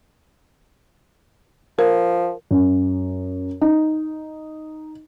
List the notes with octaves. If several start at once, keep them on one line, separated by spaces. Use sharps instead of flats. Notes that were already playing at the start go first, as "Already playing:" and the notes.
F3 A#4
F#2
D#4